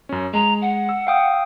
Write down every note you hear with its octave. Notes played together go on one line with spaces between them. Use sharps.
F#2 C#4
G#3 A#5
F#5
E6
F5 G5 D#6